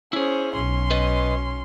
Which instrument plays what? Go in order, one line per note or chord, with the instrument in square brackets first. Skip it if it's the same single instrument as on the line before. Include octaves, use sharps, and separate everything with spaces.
[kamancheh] C#4 C5 [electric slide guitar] E4 G#4
[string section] B1 [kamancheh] C#4 C6
[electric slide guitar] B4 D#5